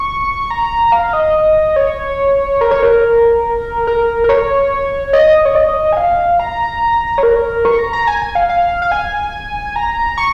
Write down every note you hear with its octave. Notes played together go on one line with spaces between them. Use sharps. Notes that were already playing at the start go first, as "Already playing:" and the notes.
Already playing: C#6
A#5
F5
D#5
C#5
A#4
C#5
A#4
A#4
A#4
C#5
D#5
C#5
D#5
G#5
F5
A#5
C#5
A#4
C#6
A#5
A#5
G#5
G#5
F5
F5
F5
G#5
A#5
C#6